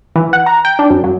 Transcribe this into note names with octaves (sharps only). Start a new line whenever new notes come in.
E3
F#5
A#5
G5
D4
F#2
F#3